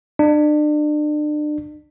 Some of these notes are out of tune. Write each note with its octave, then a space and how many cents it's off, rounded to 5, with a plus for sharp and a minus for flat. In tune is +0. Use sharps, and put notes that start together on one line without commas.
D4 +35